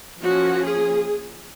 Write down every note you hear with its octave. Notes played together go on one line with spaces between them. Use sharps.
F3 A#3 C#4 F#4
G#4